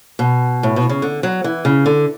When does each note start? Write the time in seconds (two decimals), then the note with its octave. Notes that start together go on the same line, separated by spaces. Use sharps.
0.19 B2
0.63 A2
0.76 B2
0.89 C#3
1.02 D3
1.23 F#3
1.44 E3
1.65 C#3
1.86 D3